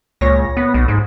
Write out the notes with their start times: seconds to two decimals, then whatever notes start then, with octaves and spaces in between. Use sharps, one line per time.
0.21 C#2 A#2 C#5 A#6
0.57 B3
0.74 B1
0.88 G#2